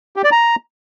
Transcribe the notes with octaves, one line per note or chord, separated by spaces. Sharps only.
G4
D5
A#5